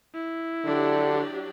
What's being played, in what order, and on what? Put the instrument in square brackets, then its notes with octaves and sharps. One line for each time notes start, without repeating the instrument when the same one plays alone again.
[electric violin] E4
[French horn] D3 [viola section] F#3 D4 G4